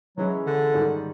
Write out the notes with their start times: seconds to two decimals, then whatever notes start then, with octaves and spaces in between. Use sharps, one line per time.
0.17 E3 F#3 G#3 C#4 E4
0.46 D3
0.74 G#2 D#3 G3